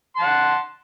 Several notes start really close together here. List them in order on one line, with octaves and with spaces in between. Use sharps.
C6 A5 F#5